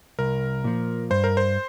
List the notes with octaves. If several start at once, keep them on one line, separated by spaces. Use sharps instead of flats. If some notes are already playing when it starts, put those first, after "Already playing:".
C2 A#4
A#2 F3
G2 C5
A#4
C5